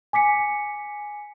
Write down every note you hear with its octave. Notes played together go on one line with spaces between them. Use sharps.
G#5 D6 B6 C#7